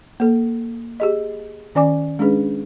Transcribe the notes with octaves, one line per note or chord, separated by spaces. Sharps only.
A#3 A4
G4 G#4 D#5
D#3 C#4 D5 G#5 D6
G#3 C#4 D4 G#4 B4